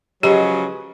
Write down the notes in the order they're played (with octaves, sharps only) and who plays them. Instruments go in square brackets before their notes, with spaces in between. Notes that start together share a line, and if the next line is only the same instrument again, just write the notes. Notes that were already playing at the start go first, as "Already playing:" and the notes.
[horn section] C#3 F3 F#3 [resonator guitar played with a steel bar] G#3 B4 D#5 [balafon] G4